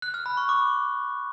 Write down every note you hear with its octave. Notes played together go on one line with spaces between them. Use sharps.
F#6
F6
B5
C#6
D6